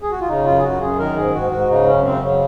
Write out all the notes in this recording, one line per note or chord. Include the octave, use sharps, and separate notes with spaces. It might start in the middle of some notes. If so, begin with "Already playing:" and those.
G#4
F#4
F4
C#3 D#4
F#2 F4
G#4
F#2 F#4
F#2 G#4
D#3 A#4
G#2 G#4
G#2 F#4
G#2 F#4
C#3 D#4
F#2 C#4
C#3 C4
C#3 F#3